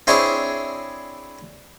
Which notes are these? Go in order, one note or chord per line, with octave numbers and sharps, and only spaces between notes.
C4 D4 E4 G#4 C5 C#5